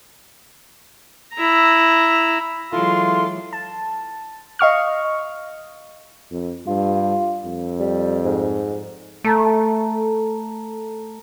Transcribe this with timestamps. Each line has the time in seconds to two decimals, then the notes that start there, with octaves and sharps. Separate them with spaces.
1.34 E4 A#5
2.73 E3 F#3 G#3 E4 F4 A4 C6
3.53 A5
4.59 D#5 F5 C#6 F6
6.31 F2
6.67 G2 F4
7.45 F2
7.80 G3
8.25 G#2
9.24 A3 A4 A5 A#5